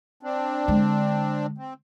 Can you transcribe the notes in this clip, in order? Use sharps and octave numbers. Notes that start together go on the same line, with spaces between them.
C4 D4
D3 G#3
C4